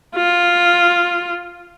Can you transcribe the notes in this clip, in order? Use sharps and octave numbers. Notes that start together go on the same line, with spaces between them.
F4